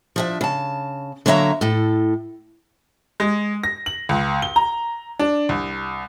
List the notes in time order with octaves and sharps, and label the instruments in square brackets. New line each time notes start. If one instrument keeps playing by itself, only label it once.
[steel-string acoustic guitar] F3 D4 E5
C#3 A5
D3 F#3 A#3 C#5 E5 A#5
A2 A4
[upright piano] G#3
A#6
F#7
C#2
G7
A#5
D4
C2